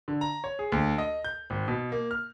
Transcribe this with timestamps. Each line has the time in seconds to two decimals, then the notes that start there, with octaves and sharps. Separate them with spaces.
0.08 D3
0.21 A#5
0.44 C#5
0.59 G#4
0.72 D2
0.98 D#5
1.24 G6
1.50 G#1
1.68 B2
1.92 A#3
2.11 F6